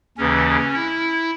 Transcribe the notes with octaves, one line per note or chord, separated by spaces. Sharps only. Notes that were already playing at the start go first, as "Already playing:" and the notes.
D#2 C#3 E3 C#4
E4